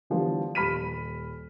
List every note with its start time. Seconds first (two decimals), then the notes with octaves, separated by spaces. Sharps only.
0.10 D3 E3 F3 G3 B3
0.55 D#1 G3 B5 F6 B6 D#7